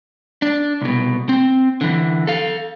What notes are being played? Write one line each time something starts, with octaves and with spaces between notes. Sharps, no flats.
D4
C2 B2
C4
D3 E3
A4 F5